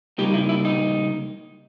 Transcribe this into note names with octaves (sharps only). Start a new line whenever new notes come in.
C#3 G3 A#3 D#4 G4
E4
E4
D#4